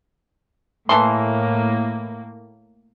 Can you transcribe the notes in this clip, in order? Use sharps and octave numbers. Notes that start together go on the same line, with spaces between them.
A2 E3 A3 A#3 C6